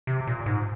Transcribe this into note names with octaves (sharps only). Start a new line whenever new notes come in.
C3
A#2
G#2